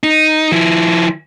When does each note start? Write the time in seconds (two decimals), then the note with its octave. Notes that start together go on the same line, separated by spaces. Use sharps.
0.03 D#4
0.52 F3 E4